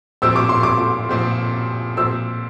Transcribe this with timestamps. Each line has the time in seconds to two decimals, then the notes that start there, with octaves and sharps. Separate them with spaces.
0.22 A#2 F3 C4 G4 E6
0.36 D6
0.49 C6
0.63 D6
1.09 A#2 F3 C4 G4
1.97 A#2 F3 C4 G4 E6